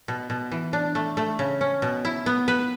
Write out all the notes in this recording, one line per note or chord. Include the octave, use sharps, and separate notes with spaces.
B2
B2
E3
D4
A3
A3
C#3
C#4
B2
E4
B3
B4